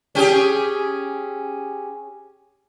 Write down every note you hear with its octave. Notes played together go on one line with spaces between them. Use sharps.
C#4 G4 G#4